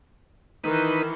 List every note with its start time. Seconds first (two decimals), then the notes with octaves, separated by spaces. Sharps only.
0.64 D#3 E3 D#4 B4